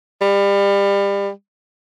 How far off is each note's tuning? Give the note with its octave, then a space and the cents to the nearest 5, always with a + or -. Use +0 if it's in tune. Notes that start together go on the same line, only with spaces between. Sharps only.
G3 +30